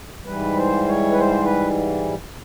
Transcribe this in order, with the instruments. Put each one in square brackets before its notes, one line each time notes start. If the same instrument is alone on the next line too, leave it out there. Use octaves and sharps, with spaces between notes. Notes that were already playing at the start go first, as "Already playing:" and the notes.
[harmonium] G#2 E3 G3 B4
C5
C#5
B4
C5
B4